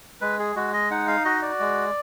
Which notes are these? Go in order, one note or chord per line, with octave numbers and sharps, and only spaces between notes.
G#3 B4
G#4
G#3 F#4
D#5
D#4 F#5
F5
F#4 D#5
D5
G#3